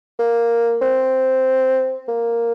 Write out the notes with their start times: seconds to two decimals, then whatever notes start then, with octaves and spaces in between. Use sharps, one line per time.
0.19 A#3
0.81 C4
2.08 A#3